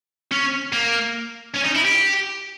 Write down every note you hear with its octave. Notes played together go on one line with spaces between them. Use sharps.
C#4
A#3
C#4
D#4
E4
G4